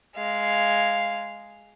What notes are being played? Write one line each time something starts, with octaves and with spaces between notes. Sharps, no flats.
G#3 F5